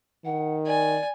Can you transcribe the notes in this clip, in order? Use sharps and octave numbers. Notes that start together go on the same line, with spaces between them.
D#3 F#5
D5 G#5